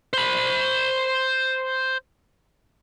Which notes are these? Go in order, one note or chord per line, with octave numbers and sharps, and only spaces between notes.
C5 B5